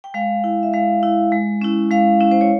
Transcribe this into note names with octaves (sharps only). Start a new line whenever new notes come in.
G5
G#3 F5
E4
E5
G#3 F5
E4
G#3
C#4 E4
G#3 F5
C#4 E4
C5
C#5